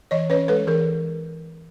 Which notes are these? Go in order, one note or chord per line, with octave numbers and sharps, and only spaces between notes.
E3 C#5 D#5
C#4 B4 C#5
G#3 A4 B4
E3 G#4 A#4